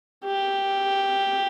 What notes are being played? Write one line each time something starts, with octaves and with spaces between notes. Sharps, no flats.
G4